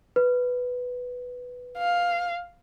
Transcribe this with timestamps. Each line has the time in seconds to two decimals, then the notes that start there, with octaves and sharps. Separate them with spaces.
0.16 B4
1.78 F5